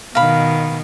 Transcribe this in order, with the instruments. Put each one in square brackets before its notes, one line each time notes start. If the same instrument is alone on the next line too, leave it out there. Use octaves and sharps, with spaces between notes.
[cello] B2 D#3 [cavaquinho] F5 B5